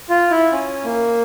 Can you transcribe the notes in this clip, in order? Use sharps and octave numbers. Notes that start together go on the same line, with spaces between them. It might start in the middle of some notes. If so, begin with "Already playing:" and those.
F4
E4
C#4
A#3